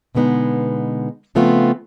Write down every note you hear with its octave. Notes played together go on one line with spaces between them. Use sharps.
B2 D3 G#3 B3 D#4
C#3 F3 A3 B3 C4 F4